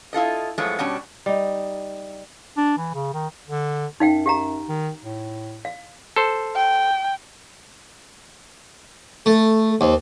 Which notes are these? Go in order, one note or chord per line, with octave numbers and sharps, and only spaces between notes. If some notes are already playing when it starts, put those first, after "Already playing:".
E4 F4 A4 D#5
F#2 F3 G#3 A3 B3 C#4
B2 G3 C#4 D4
G3 D#4
D4
E3
C#3
D#3
D3
F#2 D#4 F5 G5
G4 F5 A#5
D#3
A2
F5
A4 C5
G5
A3 A4
D#2 C5